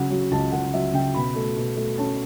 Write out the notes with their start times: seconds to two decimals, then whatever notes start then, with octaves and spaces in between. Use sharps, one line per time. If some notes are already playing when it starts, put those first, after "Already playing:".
Already playing: C#3 F#3 F#5
0.11 F#3
0.31 C#2 A5
0.52 C#2 F#5
0.73 F#3 E5
0.94 C#3 G5
1.14 B2 B5
1.36 A3
1.57 B2
1.77 A3
1.98 C#4 A5